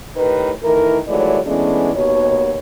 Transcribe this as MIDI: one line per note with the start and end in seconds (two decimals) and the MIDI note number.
0.17 0.52 45
0.17 0.52 51
0.17 0.52 67
0.17 0.52 71
0.62 0.98 51
0.62 0.98 52
0.62 0.98 57
0.62 0.98 64
0.62 0.98 70
1.08 1.39 39
1.08 1.39 52
1.08 1.39 54
1.08 1.39 56
1.08 1.39 57
1.08 1.39 74
1.46 1.91 52
1.46 1.91 56
1.46 1.91 57
1.46 1.91 59
1.46 1.91 61
1.46 1.91 62
1.94 2.58 39
1.94 2.58 47
1.94 2.58 73